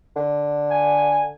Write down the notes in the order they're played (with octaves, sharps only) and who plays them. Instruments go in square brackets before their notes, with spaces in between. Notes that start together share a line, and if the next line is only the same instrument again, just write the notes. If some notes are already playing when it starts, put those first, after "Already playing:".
[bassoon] D3
[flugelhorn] G#5